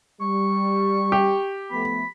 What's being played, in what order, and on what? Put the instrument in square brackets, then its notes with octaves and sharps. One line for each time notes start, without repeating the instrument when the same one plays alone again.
[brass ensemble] G3 [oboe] C#6
[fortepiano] G4
[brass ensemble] F3 A3 B3 [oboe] B5